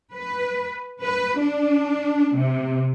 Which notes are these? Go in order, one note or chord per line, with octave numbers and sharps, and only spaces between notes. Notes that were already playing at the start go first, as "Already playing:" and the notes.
B4
B4
D4
C3